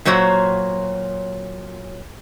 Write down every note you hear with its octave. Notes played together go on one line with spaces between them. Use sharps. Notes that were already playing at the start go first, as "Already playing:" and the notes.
A#2 F#3 F#4 C5 C#5